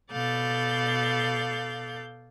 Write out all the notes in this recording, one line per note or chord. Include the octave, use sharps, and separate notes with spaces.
B2 A4 D5 F5 G6